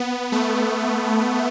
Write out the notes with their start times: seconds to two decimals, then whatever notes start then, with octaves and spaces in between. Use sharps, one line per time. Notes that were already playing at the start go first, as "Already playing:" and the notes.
Already playing: B3
0.32 A3